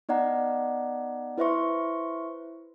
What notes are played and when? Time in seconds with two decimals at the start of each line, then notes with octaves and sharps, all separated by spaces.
0.09 B3 D#4 D5 D#5 F#5 A#5
1.38 E4 B4 C5 E5 C6 C#6